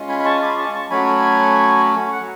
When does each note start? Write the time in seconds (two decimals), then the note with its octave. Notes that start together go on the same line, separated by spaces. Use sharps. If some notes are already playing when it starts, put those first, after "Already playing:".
Already playing: G#3 C#4 F4
0.09 G#5 B5
0.19 B5
0.25 A5 C#6
0.42 B5 D6
0.58 A5 C#6
0.74 A5 C#6
0.90 F#3 A3 C#4 F#4 G#5 B5
2.12 F#5
2.20 F#3